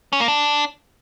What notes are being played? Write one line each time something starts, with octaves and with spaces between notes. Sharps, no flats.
C#4
A#3
D4